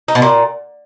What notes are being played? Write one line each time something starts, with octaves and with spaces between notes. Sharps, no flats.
D#4
B2
A#2